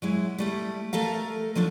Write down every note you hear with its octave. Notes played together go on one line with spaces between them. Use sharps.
F#3 G#3 E4
G3 A3 E4
A3 A4 A#4 F5
F3 F#3 D4 F4